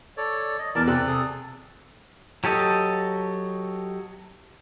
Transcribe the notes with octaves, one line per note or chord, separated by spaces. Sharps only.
A4 C#5 D5
D#5
E2 A#4 D5 A5
C3 C4 D5 F#6
G#4 A4
F#3 G4 A4 D#5